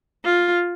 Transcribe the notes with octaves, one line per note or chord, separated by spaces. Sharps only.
F4